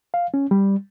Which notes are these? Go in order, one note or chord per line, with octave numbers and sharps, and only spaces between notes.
F5
C#4
G3